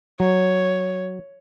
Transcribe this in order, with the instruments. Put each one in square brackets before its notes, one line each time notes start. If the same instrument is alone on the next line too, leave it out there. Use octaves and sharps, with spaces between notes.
[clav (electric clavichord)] F#3 [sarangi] C#5